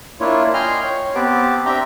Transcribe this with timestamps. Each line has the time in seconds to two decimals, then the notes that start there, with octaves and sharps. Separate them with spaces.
0.20 A#3 D4 E4 F4 C#5
0.54 D#5 G5 G#5 C6 F6
0.83 C#5
1.15 B3 C4 G4 B4 A5 D6
1.65 C4 D4 G4 E5 G5 A#5